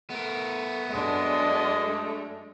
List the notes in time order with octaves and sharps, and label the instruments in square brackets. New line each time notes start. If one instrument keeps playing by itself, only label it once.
[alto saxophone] A3 [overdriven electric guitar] B3 A#4
[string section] F#2 G#3 D4 [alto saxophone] A3 [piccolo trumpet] D#5